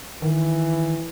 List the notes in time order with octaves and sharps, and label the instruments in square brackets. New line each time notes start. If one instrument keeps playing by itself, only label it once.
[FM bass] D#3 [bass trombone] E3